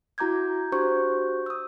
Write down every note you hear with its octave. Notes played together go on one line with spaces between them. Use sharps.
E4 F#4 A#5 D6 G6 G#6
D4 F#4 G4 C5 C#6 G6
D#6 E6